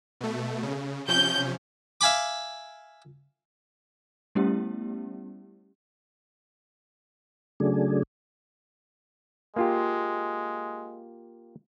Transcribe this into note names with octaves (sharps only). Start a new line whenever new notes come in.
B2 A3
C#3
C3 F3 C#4 G6
E5 F5 G#5 B5 D6
G3 A3 B3 C#4 E4 G4
C#3 F#3 A3 D4 G#4
G#3 A#3 F4 G4